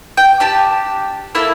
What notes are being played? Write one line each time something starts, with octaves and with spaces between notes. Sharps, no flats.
G5
D4 G4 A5
A#3 E4 A4